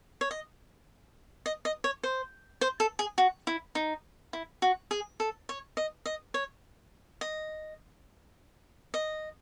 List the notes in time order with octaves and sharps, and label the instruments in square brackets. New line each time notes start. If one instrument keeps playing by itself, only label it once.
[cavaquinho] C#5
D#5
D#5
D#5
C#5
C5
C5
A4
G#4
F#4
E4
D#4
E4
F#4
G#4
A4
C#5
D#5
D#5
C#5
D#5
D#5